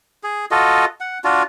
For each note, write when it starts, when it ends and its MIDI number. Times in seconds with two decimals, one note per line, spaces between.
0.23 0.45 68
0.51 0.85 65
0.51 0.85 66
0.51 0.85 69
0.51 0.85 75
1.00 1.18 78
1.24 1.43 62
1.24 1.43 65
1.24 1.43 66